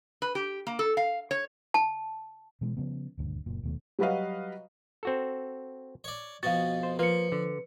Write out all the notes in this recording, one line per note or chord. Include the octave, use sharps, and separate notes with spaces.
B4
G4
A#3
A4
F5
C#5
A5
B2 E3 G#3
C#3 F3 G3 B3
D#1 D2 G2
F#1 A#2
D#1 D#2 B2 A3
F#3 G3 F#4 B4 D#5 F5
C4 F#4 A4
C#5 D5
F2 B2 B3 F#4 F5 A6
C5
F3 A#3 F4 B4 F5 C#7
D3